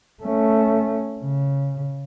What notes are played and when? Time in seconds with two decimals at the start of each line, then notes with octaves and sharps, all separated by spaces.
0.23 A3 C#4
1.20 C#3